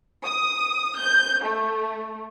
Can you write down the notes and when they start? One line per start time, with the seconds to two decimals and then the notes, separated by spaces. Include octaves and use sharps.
0.24 D#6
0.97 G6
1.43 A3